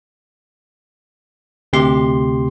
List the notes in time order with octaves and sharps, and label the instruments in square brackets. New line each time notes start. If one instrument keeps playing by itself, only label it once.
[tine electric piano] D2 C3 G4 C6